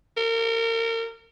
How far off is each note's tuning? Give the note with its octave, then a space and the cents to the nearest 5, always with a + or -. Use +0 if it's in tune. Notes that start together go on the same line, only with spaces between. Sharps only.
A#4 -30